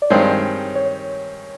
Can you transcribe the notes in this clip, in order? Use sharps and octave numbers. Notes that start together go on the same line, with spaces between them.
D5
G2 D#3 G#3 C4 C#5
C#5